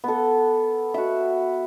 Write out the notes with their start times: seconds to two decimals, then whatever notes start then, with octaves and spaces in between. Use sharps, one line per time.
0.04 B3 A4
0.94 F#4 E5